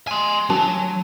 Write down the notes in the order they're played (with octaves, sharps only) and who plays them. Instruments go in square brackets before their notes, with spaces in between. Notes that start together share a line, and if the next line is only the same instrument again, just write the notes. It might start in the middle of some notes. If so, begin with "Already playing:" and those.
[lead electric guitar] G#5 C6
[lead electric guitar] F#3 [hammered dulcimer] G#5 A5